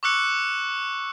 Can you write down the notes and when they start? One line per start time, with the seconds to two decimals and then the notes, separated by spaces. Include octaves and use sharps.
0.03 C#6 D6 E6 F#6 C#7